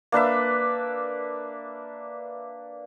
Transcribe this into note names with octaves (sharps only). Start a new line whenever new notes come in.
A#3 D4 B4 E5